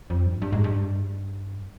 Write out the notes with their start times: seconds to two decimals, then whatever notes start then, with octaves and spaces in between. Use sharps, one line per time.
0.10 F2
0.26 G2
0.42 G2
0.52 G#2
0.64 G2